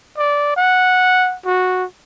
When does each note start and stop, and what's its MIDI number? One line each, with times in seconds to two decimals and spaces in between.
0.18 0.52 74
0.56 1.36 78
1.46 1.84 66